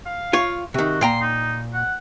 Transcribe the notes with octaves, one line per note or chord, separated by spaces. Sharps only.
F5
F4 C#5
C3 D#3 F#4
A#2 G5 A#5 C6
D#4
F#5